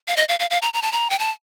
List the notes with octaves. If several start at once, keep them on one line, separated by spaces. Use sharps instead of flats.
F5
D#5
F5
F5
F5
A#5
A#5
A5
A#5
G5
A5